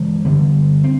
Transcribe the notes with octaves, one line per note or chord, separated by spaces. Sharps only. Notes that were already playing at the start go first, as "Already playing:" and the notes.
Already playing: C#3 E3 G#3
D3 G3 B3
C4